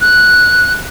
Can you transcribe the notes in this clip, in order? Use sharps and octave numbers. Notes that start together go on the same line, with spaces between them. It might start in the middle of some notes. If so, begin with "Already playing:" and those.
F#6